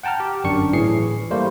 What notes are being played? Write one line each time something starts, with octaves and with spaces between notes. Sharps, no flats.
F#5 G5 A5 A#5 F6
G4
G1 F#2 D4 C#6 C#7
A2 E3 G#4 C7 C#7
G3 A3 A#3 C5